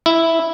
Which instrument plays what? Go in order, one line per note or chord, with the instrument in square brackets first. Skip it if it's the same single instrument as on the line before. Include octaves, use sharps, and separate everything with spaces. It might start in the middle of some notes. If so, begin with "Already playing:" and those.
[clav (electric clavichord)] E4